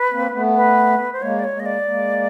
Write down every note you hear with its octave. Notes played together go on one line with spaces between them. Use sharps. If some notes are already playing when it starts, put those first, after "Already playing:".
Already playing: B4
A#3 C4
A3 B3
B4
C5
G#3 A#3 C#5
D5
C#5
G#3 A#3
D#5
D5
G#3 A#3